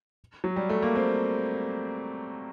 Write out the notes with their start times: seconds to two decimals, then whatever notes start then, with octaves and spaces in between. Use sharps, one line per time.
0.44 F#3
0.56 G3
0.69 A3
0.83 A#3
0.96 C4